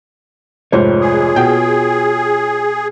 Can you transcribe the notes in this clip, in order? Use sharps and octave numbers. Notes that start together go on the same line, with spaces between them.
F1 G#2 F4 G4 C5 C#5
G#4
B2 G5 G6